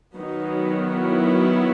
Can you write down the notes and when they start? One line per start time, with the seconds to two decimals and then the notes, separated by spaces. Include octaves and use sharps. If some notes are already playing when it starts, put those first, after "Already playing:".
0.16 D#3 F#3 B3 D#4
0.91 E4